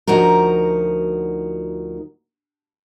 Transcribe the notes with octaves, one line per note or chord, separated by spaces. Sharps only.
D2 F3 D#4 F#4 A#4